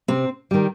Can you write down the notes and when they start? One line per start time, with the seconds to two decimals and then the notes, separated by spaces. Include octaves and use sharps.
0.08 C3 C4
0.51 D#3 G3